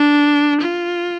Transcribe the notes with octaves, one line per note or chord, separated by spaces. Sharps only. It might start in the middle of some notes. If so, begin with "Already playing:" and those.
Already playing: D4
F4